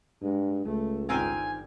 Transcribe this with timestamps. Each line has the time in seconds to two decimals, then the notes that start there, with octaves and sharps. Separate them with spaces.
0.22 G2 G#3
0.65 C#2 A3
1.09 G1 D#3 G3 C4 F4 G#5